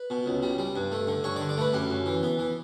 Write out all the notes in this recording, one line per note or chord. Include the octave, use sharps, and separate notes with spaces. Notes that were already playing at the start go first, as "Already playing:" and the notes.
Already playing: B4
B2
C#2
G3
G3
G2
A3
D3
G2 C#5
D5
D3
D5
A3 B4
F#2 G4
F#2
E3
B3
E3